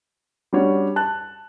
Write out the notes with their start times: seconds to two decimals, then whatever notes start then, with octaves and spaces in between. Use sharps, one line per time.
0.53 G3 C#4 D4 F#4 C#5
0.96 A5 F#6